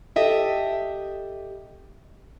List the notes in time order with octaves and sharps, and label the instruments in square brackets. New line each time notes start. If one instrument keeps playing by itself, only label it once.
[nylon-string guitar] G4 A4 D#5 E5 G5